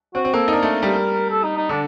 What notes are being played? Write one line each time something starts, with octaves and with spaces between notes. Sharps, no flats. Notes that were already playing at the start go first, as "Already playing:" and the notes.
C4 F#4
C4
A#3 A4
D#4
D4 A#4
A3
G3
A4
D#4
D#4
D3 D4